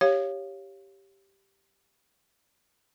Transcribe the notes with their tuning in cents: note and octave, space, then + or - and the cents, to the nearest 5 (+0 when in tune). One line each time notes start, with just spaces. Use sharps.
G4 +0 C#5 +0 F5 +0